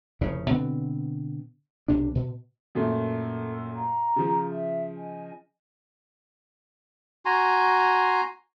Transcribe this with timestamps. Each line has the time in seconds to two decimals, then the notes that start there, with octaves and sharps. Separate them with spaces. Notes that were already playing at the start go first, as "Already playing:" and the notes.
0.21 F1 A2 C#3
0.50 B2 D3 B3 C4
1.88 B1 C3 D4
2.15 B2
2.75 F#2 A#2 A3
3.16 A4
3.73 F5 A#5
4.16 C#3 F3
4.49 E5
4.97 D#5 G#5 A5
7.25 F#4 G#5 A#5 C6